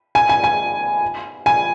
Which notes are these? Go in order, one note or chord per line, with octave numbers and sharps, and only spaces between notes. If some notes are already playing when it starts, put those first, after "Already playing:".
G#5
G#5
G#5
G#5